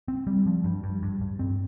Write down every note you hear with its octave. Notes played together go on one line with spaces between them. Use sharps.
C4
G3
F3
G2
G2
G2
G2
C4